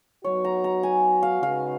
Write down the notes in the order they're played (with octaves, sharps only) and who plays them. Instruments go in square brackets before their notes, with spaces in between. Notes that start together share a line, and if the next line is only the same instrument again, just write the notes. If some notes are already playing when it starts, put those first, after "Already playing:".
[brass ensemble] F#3 B3 D#4 F#4 [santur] C#5
[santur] A#5
A#5
G#5
F5
[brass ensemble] C#3 G#3 D#4 F#4 B4 [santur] F5